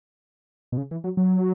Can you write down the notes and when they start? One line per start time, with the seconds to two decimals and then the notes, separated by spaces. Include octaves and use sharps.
0.72 B2
0.77 C#3
0.91 E3
1.04 F#3
1.17 F#3